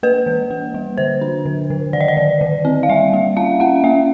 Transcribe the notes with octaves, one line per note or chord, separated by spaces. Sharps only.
A#3 B4
E3
A#3
G3
D3 C5
D4
D3
D3
D#3 D5
D#5
D5
D#3
D#3
C4
F5
G3 E5
A#3
C#4 F5
C#4 F#5
A#3 E5